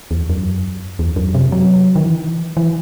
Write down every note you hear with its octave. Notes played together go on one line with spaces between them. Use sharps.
E2
F#2
E2
F#2
C3
F#3
D#3
E3
E3